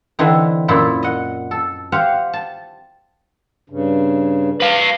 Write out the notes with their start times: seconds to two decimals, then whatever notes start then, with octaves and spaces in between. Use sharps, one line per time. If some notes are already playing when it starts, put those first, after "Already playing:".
0.19 D3 E3 C4 D#4
0.68 F#2 A#2 E4
1.03 D#5 F#5
1.51 A4
1.92 G4 C5 F5 F#5
2.33 A5
3.70 G2 C#3
4.61 B4 F5